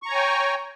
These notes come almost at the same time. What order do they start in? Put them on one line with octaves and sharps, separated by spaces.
C#6 A#5 C#5 G#5 G5